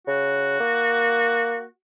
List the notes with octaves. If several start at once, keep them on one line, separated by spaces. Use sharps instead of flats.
C#3 F#4
A#3